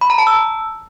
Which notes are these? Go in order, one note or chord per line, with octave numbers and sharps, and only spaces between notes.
B5
A#5
A5
E6